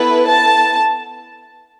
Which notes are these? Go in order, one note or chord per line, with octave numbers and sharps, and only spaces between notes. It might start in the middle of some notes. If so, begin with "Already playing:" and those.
Already playing: B3 E4 A4 B4
A5